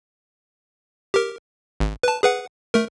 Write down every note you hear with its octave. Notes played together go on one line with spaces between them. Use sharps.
G4 A#4
G#1
B4 A5
G#4 B4 F#5
A3 A#4